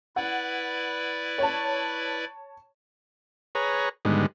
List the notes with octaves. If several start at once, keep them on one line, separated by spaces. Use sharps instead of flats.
E4 B4 D5 F#5
C#5 A5
G#4 B4 C#5 A#5
G#2 D3 D#3 G3 G#3 B3